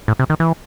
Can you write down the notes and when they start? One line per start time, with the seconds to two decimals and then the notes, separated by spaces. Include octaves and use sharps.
0.08 A2
0.19 C3
0.30 D#3
0.40 E3